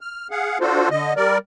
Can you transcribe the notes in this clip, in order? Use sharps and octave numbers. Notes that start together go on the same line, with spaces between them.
F6
G#4 F5 F#5
D4 F4 F#4 A4 C5
D3 D#5
G3 A#4 D5